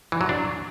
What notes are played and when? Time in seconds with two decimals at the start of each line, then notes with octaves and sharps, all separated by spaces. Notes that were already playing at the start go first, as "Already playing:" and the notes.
0.12 E3
0.21 F#3
0.29 D4